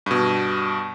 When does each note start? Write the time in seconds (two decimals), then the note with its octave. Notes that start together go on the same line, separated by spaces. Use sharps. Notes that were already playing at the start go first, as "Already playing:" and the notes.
0.06 G2 B2